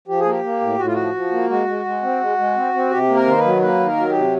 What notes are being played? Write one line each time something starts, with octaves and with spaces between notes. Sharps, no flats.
F3 G4
G#4
A#3 G4
A#3
A2
A2 F#4
F4
F3 F#4
F3
A#3
G#3 F#4
G#3
G#3
C4
G#3
G#3
C4
C4
C3 G4
A#3
A#4
D#3 C5
B4
F#3
A#3 B4
D#3
A#4
F#3
G4
C3